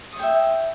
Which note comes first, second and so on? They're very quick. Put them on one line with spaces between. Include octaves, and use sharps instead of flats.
D#6 C#5 G5 E5